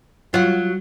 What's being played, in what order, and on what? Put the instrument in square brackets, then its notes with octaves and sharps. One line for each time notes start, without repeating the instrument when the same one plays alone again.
[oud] F#3 [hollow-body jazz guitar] F4 F#5